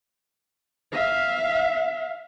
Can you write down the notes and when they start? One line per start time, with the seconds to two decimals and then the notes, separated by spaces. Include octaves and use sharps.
0.92 E5 F5